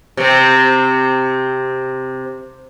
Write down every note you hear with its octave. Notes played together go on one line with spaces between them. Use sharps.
C3 C4